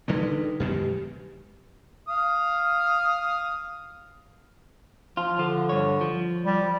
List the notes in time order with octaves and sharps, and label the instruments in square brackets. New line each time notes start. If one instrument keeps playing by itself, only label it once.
[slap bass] D3 G3 G#3 [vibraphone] D#4 B4
[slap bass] F#2 B2 D#3 [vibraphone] G#3 G4
[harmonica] F5 D#6
[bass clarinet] F3 [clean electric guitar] F4
[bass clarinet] D3 [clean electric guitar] F3
[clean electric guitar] G2 C#5
F3
[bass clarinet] G3